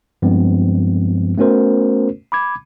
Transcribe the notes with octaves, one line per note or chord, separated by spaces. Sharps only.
G2 F3 G#3 B3 C4
A3 B3 C#4 F#4 A#4 C5
B5 D6 G#6